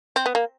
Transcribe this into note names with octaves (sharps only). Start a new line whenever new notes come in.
C4
B3
A#3